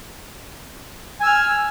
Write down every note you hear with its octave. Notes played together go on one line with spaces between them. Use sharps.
G#5 E6 F6